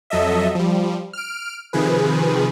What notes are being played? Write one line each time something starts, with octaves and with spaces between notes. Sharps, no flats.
F2 F#3 A4 D#5 E5
F3 G3
F6 D7
C3 D#3 F3 G#4 B4